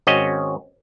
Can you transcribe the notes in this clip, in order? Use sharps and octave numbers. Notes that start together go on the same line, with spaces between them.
G#1 C4 C#4 F#4 D#5